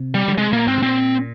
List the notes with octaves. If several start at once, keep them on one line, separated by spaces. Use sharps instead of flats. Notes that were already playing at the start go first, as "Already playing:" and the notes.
Already playing: C3
G3
D3
C3 G#3
A#2 A#3
G#2 C4
C3
A#2 C4